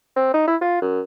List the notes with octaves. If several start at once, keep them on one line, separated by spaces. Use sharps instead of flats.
C4
D#4
E4
F4
F#2